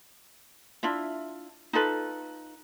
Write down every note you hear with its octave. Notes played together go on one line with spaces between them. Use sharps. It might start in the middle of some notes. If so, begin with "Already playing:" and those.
D4 E4 F4 E5
D#4 F4 A4 B4